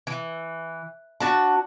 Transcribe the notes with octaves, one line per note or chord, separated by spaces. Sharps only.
E3
D4 F#4 A5